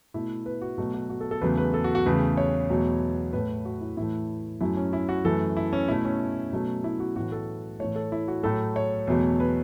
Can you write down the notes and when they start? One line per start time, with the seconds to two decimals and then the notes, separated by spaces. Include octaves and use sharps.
0.14 B2 A3 E4
0.46 B4
0.62 F#4
0.78 B2 F#3 A3 F#4
0.94 F#4
1.10 F#4
1.21 A4
1.31 A4
1.42 E2 C#3 F#3 A3 B4
1.57 B4
1.74 A4
1.84 F#4
1.95 F#4
2.06 E2 C#3 A3 B4
2.37 C#5
2.69 E2 B2 F#3 A3
3.33 A2 A3 B4
3.65 F#4
3.81 E4
3.97 A2 E3 A3 E4
4.61 F#2 F#3 A3 E4
4.77 C#4
4.93 E4
5.09 F#4
5.25 F#2 E3 A3 A4
5.57 E4
5.73 C#4
5.88 B2 A3 E4
6.05 C#4
6.52 B2 F#3 A3
6.84 E4
7.00 F#4
7.16 A2 E3 A3 F#4
7.32 A4
7.80 A2 E3 A3 C#5
7.96 A4
8.12 E4
8.28 F#4
8.43 A2 F#3 A3 A4
8.76 C#5
9.07 E2 B2 F#3 A3
9.40 B4